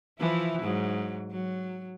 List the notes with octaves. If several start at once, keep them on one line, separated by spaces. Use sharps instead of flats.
E3 F3 E4
G#2 F#3
F#3